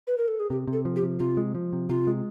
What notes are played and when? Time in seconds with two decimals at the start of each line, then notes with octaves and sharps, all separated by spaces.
0.07 B4
0.18 A#4
0.28 A4
0.40 G#4
0.50 C3 G4
0.68 C3
0.73 A4
0.85 F3
0.96 G4
1.03 C3
1.19 C3 F4
1.37 G#3
1.55 F3
1.73 C3
1.89 C3 F4
2.07 G#3